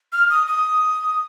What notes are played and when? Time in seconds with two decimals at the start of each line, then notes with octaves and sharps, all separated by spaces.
0.12 F6
0.30 D#6
0.47 D#6